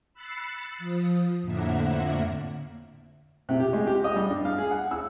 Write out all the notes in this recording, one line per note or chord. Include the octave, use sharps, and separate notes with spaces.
B5 E6 F#6 A6 C7 C#7
F3 D#6
F2 A2 D3 A#3 E5 F#5
C3
G4
G#3
G4
D#5
G3
G2
F5
G#4
F#5
E6